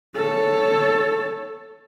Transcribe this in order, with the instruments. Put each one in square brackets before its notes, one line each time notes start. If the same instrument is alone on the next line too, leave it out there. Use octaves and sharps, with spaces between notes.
[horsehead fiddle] A4 C#5